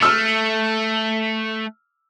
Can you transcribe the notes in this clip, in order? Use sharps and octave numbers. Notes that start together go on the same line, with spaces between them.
A3 E6 F6